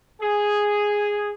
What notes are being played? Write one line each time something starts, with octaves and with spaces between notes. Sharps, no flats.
G#4